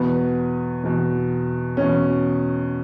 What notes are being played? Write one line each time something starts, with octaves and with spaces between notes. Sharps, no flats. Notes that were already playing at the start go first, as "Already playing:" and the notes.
Already playing: E2 B2 B3
E2 B2
E2 B2 C#4